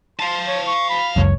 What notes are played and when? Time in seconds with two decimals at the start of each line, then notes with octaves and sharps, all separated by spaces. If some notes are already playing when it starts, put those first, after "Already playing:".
0.20 F5 A5 C6
0.47 C#5
0.67 C#6
0.89 B5
1.16 F#1 C#2 F#2 C#5